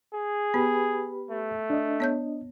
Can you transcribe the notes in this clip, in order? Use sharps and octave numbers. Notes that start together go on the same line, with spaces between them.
G#4
B3 G4 B4 B5
A3
D4 D#5
B3 C#5 G6